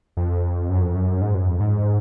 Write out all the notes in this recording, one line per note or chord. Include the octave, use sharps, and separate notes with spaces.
F2
F#2
F2
F#2
G#2
F#2
F2
G#2